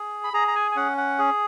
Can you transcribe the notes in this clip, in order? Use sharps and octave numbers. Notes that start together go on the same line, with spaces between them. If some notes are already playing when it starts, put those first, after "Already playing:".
Already playing: G#4
B5
G#4 A#5
A#5
G#5
G#5
C#4 F#5
F#5
G#4